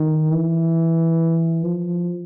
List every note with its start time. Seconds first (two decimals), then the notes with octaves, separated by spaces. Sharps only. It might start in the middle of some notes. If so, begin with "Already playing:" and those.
Already playing: D#3
0.32 E3
1.65 F3